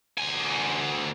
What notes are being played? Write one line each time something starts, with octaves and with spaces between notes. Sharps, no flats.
D2 G#5